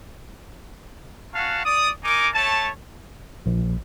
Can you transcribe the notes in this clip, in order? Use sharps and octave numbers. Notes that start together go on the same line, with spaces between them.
C#4 F#4 F5 F#5 A5
D5 D#6
D#4 A#4 G#5 D6
A3 C#5 A5
A#1